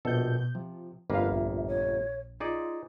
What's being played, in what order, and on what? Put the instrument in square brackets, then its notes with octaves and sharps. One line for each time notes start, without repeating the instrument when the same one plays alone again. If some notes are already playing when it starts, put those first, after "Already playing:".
[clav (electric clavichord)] A#1 A4 [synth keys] B2 G6
[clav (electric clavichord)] C3 [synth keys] F3
[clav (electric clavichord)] G1 F2 A#3 [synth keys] B4 F5
[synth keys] A#1 [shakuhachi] E5
[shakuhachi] C#5
[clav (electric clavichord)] D#4 G#4 D5 [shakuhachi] F4